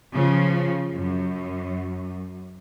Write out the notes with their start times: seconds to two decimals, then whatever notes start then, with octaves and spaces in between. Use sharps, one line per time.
0.13 C#3 F3
0.94 F#2